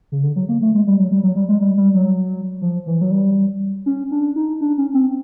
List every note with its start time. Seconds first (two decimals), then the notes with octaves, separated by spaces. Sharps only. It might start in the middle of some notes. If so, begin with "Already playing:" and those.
0.12 C#3
0.23 D3
0.36 F#3
0.49 A#3
0.62 A3
0.74 G#3
0.87 G3
0.99 F#3
1.11 G3
1.23 F#3
1.36 G3
1.49 G#3
1.61 G3
1.78 G3
1.94 F#3
2.62 F3
2.87 E3
3.01 F#3
3.11 G3
3.86 C#4
4.11 D4
4.36 D#4
4.61 D4
4.78 C#4
4.94 C4